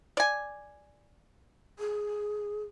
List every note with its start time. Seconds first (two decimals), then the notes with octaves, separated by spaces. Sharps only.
0.17 D5 G#5
1.79 G#4